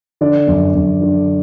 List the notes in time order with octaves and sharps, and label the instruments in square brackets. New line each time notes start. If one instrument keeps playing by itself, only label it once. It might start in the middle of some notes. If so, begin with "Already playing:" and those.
[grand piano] D3 D5
F#2
F#2
D3